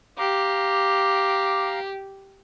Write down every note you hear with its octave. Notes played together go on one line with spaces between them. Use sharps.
G4 F5 A#5 D6